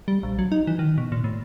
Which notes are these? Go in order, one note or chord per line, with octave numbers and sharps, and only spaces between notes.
G3
A#1
F#3
D#4
E3
D#3
B2
A#2
A2